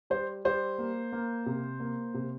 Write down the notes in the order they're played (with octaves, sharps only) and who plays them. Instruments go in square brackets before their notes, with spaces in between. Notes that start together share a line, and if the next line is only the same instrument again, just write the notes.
[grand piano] G3 C5
G3 C5
A#3
A#3
C3
A#3
C3